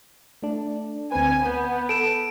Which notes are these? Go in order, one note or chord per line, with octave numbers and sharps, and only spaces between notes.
A3 D4
D2 C4 B4 G#5
B3 G6
A4 D7 E7